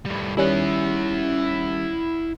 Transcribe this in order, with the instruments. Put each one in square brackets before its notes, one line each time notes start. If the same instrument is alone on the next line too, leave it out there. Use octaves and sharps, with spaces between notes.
[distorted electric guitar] A2 G3
[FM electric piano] D#3 G3 C#4 [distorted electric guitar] E4 F#5